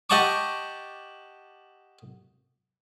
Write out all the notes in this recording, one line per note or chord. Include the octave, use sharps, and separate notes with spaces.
G4 D#5 F#5 A5 C#6 D6